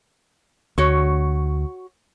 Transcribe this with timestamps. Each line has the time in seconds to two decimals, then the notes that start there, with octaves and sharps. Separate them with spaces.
0.78 D2 F#4 C#5